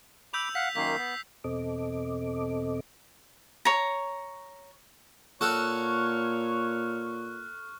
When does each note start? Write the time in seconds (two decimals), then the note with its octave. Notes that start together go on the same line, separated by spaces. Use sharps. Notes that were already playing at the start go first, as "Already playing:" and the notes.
0.34 B5 D6 E6 G6 F7
0.55 F5 F#5 B6
0.76 F#2 D#3 A#3 B6 C7
0.98 B3
1.44 E2 B2 C4 A4 D#5 D6
3.65 C#5 A#5
5.41 A#2 A4 C#5 F#5 C#6 F6 F#6